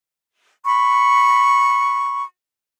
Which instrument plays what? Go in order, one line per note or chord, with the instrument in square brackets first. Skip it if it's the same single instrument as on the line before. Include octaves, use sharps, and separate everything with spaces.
[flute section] B5 C#6